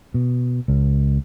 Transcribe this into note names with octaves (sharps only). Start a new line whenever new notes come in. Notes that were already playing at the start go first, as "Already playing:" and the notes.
B2
C#2